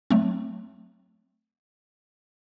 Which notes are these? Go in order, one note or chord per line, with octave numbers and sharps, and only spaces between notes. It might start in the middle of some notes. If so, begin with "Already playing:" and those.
F#3 A3 C4